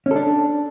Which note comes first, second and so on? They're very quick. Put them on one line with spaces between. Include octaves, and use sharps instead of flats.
C#4 A4 D4